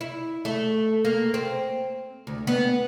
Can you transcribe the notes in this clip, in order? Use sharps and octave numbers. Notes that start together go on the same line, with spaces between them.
E4
A3
A#3
C4
D2
B3